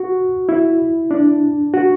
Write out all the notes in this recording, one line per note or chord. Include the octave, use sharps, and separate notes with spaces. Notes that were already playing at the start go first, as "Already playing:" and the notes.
Already playing: F#4
E4
D4
F#4